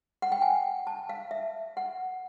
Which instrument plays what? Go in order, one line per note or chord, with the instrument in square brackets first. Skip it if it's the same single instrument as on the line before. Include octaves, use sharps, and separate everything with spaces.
[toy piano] F#5
G5
G#5
A5
F5
E5
F#5